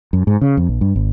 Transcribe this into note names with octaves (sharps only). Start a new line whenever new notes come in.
F#2
G#2
C#3
F2
A#1
G2
G#1